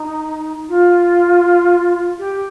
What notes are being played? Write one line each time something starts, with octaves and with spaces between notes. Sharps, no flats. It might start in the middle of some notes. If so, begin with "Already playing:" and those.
Already playing: D#4
F4
G4